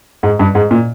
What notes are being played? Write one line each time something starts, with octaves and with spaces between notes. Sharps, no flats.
G#2
G2
G#2
A#2